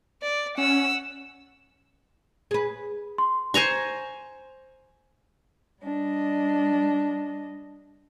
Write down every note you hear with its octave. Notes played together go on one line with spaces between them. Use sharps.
D5
C#4 F#5 E6
G#4 B4
C6
C5 G#5 A#5 C#6
G3 D4 D#5